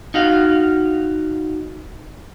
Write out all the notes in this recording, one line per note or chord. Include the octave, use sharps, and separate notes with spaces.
D#4 F#4 F5